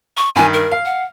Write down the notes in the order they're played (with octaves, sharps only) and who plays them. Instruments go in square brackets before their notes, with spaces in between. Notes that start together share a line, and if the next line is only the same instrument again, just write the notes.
[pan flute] C#6
[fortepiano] G2 D#3 [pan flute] G#5
[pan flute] A#4
[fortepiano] F5
[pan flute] F#5